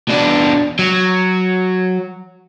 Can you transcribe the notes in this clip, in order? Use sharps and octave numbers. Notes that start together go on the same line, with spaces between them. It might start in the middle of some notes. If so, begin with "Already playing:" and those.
B2 D4
F#3